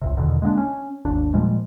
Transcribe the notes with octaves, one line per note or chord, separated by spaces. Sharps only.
C#2 G2 C3
E2 B2 D3 D#3
G#3 A#3 B3 D4
C#4
G#1 D#2 D4
A#2 F3 G3 G#3